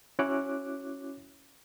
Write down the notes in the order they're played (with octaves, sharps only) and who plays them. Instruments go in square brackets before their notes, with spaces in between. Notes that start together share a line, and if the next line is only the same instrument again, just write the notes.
[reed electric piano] C#4 E4 F#4 C#5 D6 F#6